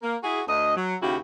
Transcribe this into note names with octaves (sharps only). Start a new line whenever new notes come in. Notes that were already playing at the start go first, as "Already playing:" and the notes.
A#3
E4 F#4 G#4
D2 D#5
F#3
D#2 C#3 E4 F#4 G4